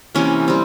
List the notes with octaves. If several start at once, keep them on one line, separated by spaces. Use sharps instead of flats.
C3 E3 A#3 C#4
G3 C4